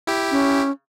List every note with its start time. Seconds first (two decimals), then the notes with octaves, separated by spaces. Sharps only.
0.07 E4 G4
0.31 C#4